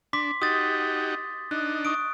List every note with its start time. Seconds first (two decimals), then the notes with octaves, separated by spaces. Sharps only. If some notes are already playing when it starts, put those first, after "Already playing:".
0.13 D4 C6 D6 B6
0.42 D#4 F#4 G4 D#6 A6
1.51 D4 D#4 F#6
1.85 C#6 D#6 D7